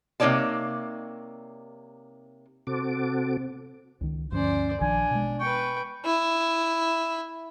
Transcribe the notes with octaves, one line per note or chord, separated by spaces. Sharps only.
C3 A#3 D#4 C#5 D5 A5
C3 C4 F#4 A4 D6
C#2 D#3
D2 G2 F3 C#4 C5 D5
A#1 D#3 F3 D4 G#5
B2 G#3
B4 G5 C#6
E4